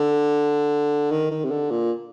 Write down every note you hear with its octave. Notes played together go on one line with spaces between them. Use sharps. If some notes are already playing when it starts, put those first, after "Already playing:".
Already playing: D3
D#3
D#3
C3
D3
A#2